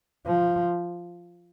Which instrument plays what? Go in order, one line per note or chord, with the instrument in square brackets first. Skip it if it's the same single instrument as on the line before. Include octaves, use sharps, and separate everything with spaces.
[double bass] F3